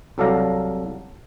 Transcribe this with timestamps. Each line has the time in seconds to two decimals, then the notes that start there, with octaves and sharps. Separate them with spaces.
0.18 C2 F#3 A4 D5 F5 A#5